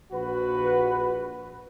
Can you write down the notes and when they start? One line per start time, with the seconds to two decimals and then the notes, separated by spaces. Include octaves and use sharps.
0.12 A#1 F#4 B4